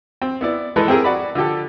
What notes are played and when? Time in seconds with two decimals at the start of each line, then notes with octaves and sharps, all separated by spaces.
0.22 C4
0.41 B3 E4 D5
0.76 E3 G#3 E4 A4 B4
0.88 C4 E4 G4 G#4 A#4
1.04 F#4 D5 B5
1.35 D3 F3 G4 A4